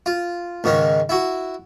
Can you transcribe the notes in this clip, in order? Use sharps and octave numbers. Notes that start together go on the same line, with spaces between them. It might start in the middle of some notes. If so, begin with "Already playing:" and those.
F4
C#2 G#2 D#3 C#4
E4 F#4